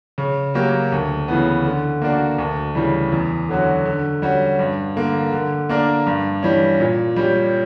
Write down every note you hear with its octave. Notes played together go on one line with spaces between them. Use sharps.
C#3
F#3 A#3 C#4 G4
D2
C#3 E3 B3
D3
A#3 D4 F#4
D2
C#3 E3 G3
E2
D3 F#3 C#4 F#4
D3
G3 C#4 F#4
G2
D3 A#3
D3
A#3 D4 A#4
G2
E3 G3 C#4
A#2
G3 C#4 G4